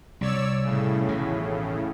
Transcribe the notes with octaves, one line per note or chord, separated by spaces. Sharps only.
C2 C3 C#5 D5 E6
A2 C#3
A1 D#2 B2